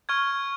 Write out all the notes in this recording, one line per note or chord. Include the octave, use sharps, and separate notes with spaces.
C#6 F6 G#6